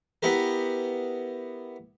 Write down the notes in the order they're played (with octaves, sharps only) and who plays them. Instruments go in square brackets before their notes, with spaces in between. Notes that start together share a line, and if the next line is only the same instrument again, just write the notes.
[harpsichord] B3 E4 G4 A#4